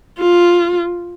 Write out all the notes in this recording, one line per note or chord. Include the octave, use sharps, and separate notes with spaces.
F4